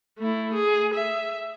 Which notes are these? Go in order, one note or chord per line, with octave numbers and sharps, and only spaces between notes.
A3 E4
G#4
E5